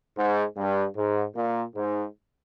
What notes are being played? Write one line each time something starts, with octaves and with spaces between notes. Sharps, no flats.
G#2
G2
G#2
A#2
G#2